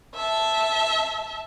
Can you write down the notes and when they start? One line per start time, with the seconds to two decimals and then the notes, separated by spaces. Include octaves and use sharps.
0.15 E5 A5